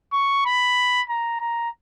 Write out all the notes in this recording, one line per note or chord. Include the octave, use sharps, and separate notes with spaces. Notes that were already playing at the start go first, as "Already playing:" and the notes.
C#6
B5
A#5
A#5